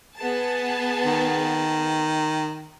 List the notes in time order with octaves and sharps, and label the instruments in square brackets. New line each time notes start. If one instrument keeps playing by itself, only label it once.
[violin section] B3 G#4 A5
[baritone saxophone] D#3